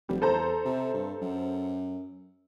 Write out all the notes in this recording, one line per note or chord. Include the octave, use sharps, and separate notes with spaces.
F1 G3
E2 A4 C5 A#5
C3
G2
F#2